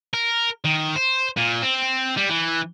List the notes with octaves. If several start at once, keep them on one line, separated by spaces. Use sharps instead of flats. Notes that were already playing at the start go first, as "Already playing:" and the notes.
A#4
D#3
C5
A#2
C4
G3
E3